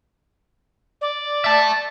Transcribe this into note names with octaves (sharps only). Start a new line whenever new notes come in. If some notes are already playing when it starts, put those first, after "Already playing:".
D5
E5 A5